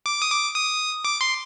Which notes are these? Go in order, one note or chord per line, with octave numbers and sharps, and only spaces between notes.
D6
D#6
D6
D#6
D6
C6